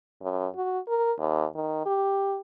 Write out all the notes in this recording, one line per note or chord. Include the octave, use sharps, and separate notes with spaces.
F#2
F#4
A#4
D#2
D#3
G4